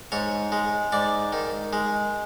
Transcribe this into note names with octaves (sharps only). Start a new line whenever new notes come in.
G#2 C#5
G#3
G#2 D5
D#3
G#3